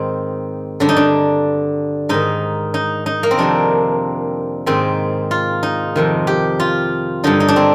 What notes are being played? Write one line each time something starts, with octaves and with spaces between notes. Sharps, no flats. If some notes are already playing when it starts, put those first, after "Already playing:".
Already playing: G#2 D#3 C4
G2 D3 D4
D#4
D4
G#2 D#3 D#4
D#4
D#4
A#3
C4
F2 C3 D#3 D4
G#2 D#3 C4
F4
D#4
F2 C3 D#3
G4
F4
G2 D3 D#4
D#4
D4
C4